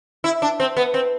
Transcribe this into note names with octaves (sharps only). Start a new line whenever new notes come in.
E4
D4
C4
B3
C4